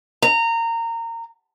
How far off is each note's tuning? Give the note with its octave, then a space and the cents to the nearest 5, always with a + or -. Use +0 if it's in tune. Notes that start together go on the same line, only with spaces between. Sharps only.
A#5 -20